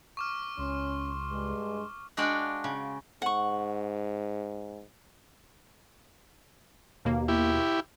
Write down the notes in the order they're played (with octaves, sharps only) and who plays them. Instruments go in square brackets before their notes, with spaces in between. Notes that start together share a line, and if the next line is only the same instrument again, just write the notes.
[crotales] C#6 D6 F6
[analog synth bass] C#2 [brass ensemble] C#4 [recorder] C6
[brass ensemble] G2 G#3
[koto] G#3 D4 F#4 D5 F5 G5
C#3
[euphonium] G#2 [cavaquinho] F#5 C#6
[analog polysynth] D#2 B2 A#3
[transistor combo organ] E4 G4